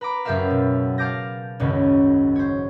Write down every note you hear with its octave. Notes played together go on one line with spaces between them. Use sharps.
B4 A#5 B5 D6
F#1 F#2 G4 A#4 E5 F5
B2
F5 A5 D6 G6 A#6
G#1 C#2 F#2 C#3
C5 C#5